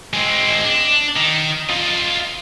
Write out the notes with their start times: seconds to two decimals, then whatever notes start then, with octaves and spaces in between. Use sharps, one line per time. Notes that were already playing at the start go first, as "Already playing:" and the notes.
0.13 G#3 C4
0.64 D4
1.16 D#3
1.69 F4 D#5